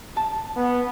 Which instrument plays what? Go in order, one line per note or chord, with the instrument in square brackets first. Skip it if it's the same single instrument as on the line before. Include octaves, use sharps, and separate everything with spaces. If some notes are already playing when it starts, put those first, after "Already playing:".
[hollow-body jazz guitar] A5
[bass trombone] B3